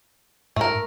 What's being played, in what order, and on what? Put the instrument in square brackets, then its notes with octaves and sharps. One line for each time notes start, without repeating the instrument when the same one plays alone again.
[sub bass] G#2 [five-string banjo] A3 A#4